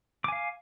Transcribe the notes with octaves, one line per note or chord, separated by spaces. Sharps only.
F5 G#5 D6